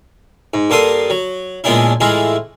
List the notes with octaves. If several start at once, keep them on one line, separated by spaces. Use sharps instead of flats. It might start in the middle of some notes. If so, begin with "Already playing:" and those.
G#2
G2 A#3 A4 C6 D#6
F#3
A#2 G#3 B3 C#4 D4 E4
A2 E3 G#3 E4 F4